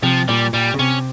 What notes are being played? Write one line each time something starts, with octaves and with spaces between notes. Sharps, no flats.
C3 F3
A#2 G3
A#2 G3
C#3
C3 C#4